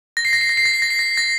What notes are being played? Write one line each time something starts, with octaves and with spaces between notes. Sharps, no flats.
A#6
C7
A#6
C7
A#6
C7
A#6
C7
A#6
C7
A#6
A#6